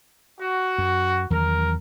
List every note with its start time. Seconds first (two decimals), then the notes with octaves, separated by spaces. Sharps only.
0.40 F#4
0.78 F#2
1.30 E2 D#3 F#3 A#4